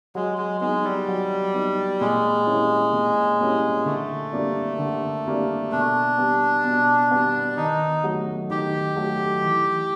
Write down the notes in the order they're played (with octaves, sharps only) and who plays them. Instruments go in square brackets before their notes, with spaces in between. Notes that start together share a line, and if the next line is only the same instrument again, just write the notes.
[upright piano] F#3 [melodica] G#3
[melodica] G#3
[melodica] G#3 [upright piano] B3 D#4
[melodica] G3
[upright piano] F#3
B3 D#4
[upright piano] A#2 [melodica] G#3
[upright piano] G3 A#3 C#4 E4
A#2
G3 A#3 C#4 E4
[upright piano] D3 [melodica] A3
[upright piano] G3 A#3 D4
D3
G3 A#3 D4
[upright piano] B2 [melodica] D4
[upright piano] G3 B3
B2
G3 B3
[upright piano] D#3 [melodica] D#4
[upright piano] F#3 A3
[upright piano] D#3 [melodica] G4
[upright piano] F#3 A3
E3